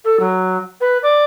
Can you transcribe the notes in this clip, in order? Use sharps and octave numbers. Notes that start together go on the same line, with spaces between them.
A4
F#3
B4
D5